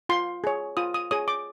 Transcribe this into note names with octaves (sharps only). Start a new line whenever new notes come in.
F4 C6
G#4 C#5
F4 D#6
D#6
G#4 C#5 D#6
D6